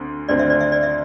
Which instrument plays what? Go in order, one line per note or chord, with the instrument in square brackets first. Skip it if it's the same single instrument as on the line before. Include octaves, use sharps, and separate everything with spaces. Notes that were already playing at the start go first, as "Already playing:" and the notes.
Already playing: [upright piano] D2 D3 C4
[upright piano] D2 D3 C4 [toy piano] D5
[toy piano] E5
D5
E5
D5
E5